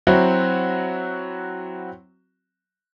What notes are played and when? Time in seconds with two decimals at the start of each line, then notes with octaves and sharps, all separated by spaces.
0.07 F#3 C4 E4 F#4